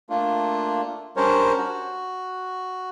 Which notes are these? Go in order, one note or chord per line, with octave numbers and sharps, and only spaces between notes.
A3 A#3 D4 F4
G3 C#4 D4 A#4 C5 C#5
F#4